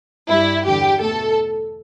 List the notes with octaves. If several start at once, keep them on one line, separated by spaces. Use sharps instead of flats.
G2 G3 E4
E2 D3 G3 G4
B2 A3 A4